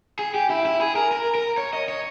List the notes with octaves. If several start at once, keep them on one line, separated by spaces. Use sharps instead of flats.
G#4
G4
E4
E4
G#4
A#4
A#4
A#4
C#5
D#5
C#5